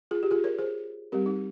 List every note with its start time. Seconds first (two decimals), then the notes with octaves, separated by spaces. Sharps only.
0.11 F4 G#4
0.23 G4
0.31 F4 G#4
0.44 A#4 C#5
0.59 G#4 C5
1.12 G3 C4 G4 A#4
1.26 D#4